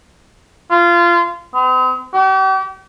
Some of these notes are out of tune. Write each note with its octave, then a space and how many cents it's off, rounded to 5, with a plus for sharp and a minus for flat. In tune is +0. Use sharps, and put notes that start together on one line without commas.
F4 -20
C4 -45
G4 -40